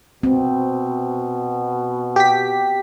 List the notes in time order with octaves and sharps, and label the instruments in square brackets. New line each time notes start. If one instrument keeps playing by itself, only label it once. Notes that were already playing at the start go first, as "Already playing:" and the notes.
[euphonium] B2 [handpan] C4
[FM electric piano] G4 B6